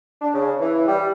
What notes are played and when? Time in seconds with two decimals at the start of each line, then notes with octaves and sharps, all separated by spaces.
0.22 D4
0.35 C#3
0.60 E3
0.88 G3